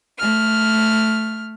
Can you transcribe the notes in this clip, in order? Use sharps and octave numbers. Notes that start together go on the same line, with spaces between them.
A3 F6